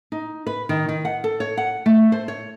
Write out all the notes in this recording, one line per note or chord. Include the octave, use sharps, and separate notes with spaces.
D#4
B4
D#3
D#3
F#5
A4
C#5
F#5
A3
C5
C#5